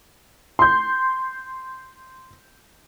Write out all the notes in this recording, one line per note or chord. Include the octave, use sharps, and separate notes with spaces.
C6 G6